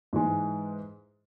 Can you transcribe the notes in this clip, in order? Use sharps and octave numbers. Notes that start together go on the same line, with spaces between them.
G#2 E3 G#3